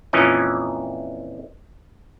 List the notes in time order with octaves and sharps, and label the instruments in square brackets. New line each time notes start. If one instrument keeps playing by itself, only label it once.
[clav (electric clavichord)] F2 A#2 E3 C#4 D#5